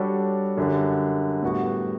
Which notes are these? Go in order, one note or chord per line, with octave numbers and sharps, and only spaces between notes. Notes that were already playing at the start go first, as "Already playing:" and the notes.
Already playing: G3 D4 F#4 A4 C#5
F#2 D3 G3
A2 G3 B3 F#4